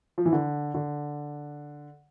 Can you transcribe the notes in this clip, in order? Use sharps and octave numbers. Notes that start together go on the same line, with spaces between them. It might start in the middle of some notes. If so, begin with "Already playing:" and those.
F3
E3
D3
D3